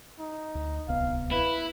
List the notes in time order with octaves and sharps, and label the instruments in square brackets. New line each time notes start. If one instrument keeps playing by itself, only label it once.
[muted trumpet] D#4
[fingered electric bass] D2
[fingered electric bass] D1 C2 B3 [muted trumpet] F5
[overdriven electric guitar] E4 [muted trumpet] B4